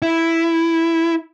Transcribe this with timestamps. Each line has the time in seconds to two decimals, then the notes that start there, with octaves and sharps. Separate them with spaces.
0.02 E4